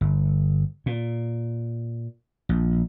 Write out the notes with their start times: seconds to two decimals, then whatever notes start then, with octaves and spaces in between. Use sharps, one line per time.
0.01 G1
0.86 A#2
2.49 A#1